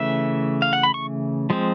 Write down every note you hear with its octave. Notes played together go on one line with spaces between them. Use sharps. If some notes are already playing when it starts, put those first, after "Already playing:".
Already playing: C#3 E3 A3 E5
F5
F#5
B5
C#6
F3 G#3 C4